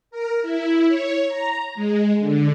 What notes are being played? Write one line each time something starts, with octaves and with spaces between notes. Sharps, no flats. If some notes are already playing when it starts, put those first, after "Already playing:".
A#4
E4
C#5
A#5
G#3
D3